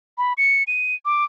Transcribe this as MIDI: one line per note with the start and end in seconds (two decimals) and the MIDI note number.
0.18 0.33 83
0.38 0.63 97
0.67 0.95 99
1.05 1.24 86